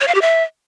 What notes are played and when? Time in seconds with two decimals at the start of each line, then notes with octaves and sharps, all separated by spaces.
0.01 C#5
0.08 F5
0.15 G4
0.22 E5